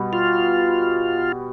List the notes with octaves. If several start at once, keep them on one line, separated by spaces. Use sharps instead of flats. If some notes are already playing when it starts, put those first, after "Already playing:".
Already playing: B2 G3 B3
F4